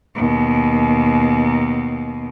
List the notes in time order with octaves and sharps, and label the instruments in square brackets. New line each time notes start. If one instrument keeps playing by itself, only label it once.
[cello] D#2 B2